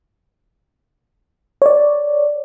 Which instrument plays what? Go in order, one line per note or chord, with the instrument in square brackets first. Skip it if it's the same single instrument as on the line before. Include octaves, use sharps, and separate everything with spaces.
[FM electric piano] C#5 D5